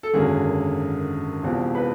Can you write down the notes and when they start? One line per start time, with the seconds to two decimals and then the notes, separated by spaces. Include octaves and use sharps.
0.03 A4
0.14 G#1 F#2 D3 F#3 A#3 G#4
1.43 E1 E2 C3 F3
1.75 B4